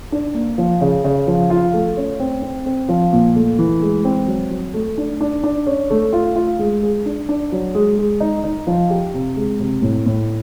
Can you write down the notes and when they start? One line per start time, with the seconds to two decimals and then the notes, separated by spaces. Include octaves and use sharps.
0.12 D4
0.34 A#3
0.58 F3
0.81 C#3
1.04 C#3
1.27 F3
1.50 F4
1.73 A3
1.97 C#4
2.20 C4
2.42 C4
2.66 C4
2.89 F3
3.13 A#2
3.36 A3
3.59 E3
3.82 G#3
4.05 C4
4.28 F#3
4.51 F#3
4.74 A3
4.98 D4
5.21 D4
5.44 D4
5.67 C#4
5.90 A3
6.13 F4
6.36 F4
6.59 G#3
6.83 G#4
7.06 D4
7.29 D4
7.52 F#3
7.75 G#3
7.98 G#3
8.20 D#4
8.44 D#4
8.67 F3
8.90 G4
9.14 C3
9.36 G#3
9.60 C3
9.82 A2
10.06 A2